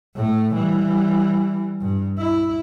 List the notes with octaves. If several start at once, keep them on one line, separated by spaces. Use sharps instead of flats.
A2 A3
E3 G3
G2
E4